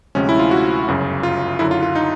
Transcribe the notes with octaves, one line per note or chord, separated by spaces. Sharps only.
D2 C3 F3 G#3 C#4
E4
F4
F#4
G1 F#2 C#3
F4
F#2 D3 F#3 E4
F4
F4
D#4